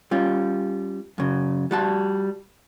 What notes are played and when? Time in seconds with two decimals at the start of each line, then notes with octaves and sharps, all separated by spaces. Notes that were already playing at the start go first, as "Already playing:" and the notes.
0.11 G3 C#4 F4
1.18 F#2 C#3
1.71 G3 F#4 A5